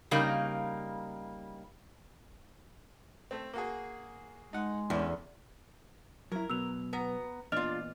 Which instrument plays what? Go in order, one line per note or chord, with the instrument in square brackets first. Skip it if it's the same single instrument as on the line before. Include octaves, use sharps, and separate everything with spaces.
[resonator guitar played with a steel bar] C#3 G3 A#3 D#4
[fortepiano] A3 C4
A#3 F#4 G#4
[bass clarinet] G#3 [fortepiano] D#4 F#5
[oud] E2 [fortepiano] C#4 D4
[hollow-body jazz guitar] F#3 E4 [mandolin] A#4
[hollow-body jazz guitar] B2 F#3 [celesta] E6 F7
[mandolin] B3 A#5 [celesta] B4
[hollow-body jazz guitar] E2 A#2 [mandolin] D4 F4 [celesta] D#5 F6 F7